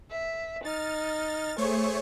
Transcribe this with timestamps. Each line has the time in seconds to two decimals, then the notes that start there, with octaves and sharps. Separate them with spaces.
0.11 E5
0.65 D#4 F6 A6
1.58 A3 G#4 C5 C#5 C#6